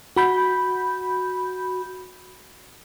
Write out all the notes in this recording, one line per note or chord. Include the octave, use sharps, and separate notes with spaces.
F#4 B5 G6